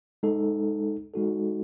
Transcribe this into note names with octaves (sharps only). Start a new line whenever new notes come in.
G#3 D#4 A4
G#3 D#4 F#4 A4